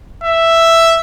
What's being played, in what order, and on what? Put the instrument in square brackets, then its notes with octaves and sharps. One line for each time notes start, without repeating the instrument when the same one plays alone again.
[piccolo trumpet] E5